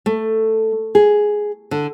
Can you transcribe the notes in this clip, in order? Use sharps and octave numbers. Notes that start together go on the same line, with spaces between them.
A3
G#4
D3